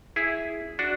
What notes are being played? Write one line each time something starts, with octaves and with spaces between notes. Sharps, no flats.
E4 G#4
D4 F#4